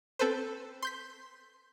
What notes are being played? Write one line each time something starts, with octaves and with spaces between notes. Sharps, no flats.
C4 A4 B4 C5
C6 G6 B6